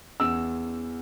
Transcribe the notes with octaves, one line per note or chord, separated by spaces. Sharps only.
E2 E6